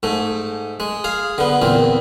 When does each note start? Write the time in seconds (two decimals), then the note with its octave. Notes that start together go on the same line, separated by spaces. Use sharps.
0.03 G#2 A3
0.80 G#3
1.04 G#4 F5
1.38 D3 B3
1.62 E2 A#2 C4